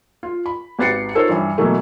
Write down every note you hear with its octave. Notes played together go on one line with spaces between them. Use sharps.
F4
B5
G#1 G4 B4 A6 C7 C#7
D#4 F4 A4 A#4 C5 C#5
G2 E3
B2 E3 F#3 A3 A#3